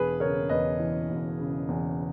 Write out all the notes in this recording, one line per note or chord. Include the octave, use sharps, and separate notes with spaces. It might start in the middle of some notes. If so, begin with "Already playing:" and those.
Already playing: E1 G#4 B4
C#3 A#4 C#5
E2 B4 D#5
E3
E1
C#3
E2